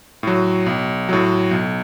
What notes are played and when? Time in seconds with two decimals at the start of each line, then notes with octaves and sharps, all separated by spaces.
0.23 A2 F#3
0.66 B1
1.09 A2 F#3
1.51 B1